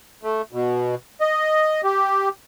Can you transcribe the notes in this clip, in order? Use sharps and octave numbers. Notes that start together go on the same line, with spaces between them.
A3
B2
D#5
G4